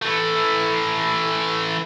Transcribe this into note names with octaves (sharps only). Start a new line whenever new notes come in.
E3 A3